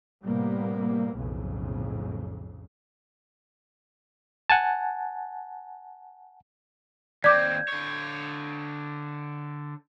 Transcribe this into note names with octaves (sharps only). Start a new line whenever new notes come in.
A2 C3 G3 A#3 B3
B1 F2 A2 C#3
F#5 G#5 A5
D#2 C4 D5 D6 G6 G#6
D3 C#5